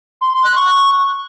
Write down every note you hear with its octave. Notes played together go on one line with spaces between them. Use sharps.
C6
C6
F#6
C#6